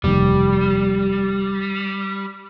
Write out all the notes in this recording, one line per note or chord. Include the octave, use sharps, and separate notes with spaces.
F1 D#2 G3